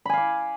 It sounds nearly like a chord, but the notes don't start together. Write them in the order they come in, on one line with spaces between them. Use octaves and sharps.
B5 G#5 F5 D6